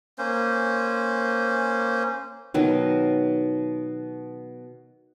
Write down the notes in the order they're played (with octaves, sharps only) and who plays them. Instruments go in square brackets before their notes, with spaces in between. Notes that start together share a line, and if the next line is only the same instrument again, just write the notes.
[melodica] A#3 C#4 C5
[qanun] B2 D#3 F#3